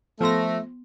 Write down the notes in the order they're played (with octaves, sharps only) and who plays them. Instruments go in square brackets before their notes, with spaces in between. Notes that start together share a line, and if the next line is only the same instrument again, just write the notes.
[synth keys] F3 A#6 [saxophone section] A3 [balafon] B3 C6